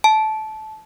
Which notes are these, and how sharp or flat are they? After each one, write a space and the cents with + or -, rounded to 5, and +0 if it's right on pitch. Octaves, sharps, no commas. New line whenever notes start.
A5 -20